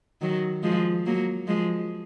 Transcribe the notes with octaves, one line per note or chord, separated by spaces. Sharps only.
D#3 F#3
F3 G#3
F#3 A#3
F3 G#3